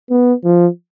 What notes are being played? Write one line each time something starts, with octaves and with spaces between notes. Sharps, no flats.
B3
F3